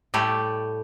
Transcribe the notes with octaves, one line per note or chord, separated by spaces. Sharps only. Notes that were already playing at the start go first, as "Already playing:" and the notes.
A2 G3 A3 G4